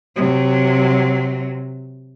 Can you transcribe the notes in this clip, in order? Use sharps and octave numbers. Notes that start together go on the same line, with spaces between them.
C3 F#3